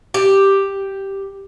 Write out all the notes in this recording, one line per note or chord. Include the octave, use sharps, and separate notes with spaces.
G4